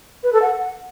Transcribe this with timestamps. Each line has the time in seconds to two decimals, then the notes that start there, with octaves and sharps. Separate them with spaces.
0.24 B4
0.33 A4
0.42 F#5